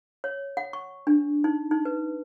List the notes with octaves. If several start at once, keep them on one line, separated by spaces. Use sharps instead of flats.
C#5
F#5
C#6
D4
D#4
D#4
B4